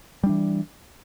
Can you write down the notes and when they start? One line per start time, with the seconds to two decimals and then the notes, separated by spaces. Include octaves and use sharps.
0.23 G3
0.26 D4
0.29 E3